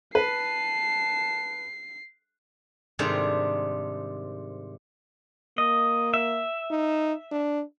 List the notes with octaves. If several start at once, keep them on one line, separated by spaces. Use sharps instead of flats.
B4 A5 C7
G#2 C3 D#3 G3 D4 G#4
A#3 D#5
E5
D#4
D4